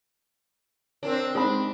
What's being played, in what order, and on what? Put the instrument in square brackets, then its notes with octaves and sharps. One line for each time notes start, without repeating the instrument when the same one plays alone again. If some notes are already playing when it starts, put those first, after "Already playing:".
[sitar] C4 D4 [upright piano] A#4 C#5
[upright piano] G#3 C4 [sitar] D4 [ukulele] D#4 B5